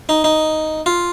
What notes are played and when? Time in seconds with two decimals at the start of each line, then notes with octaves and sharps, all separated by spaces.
0.09 D#4
0.24 D#4
0.86 F4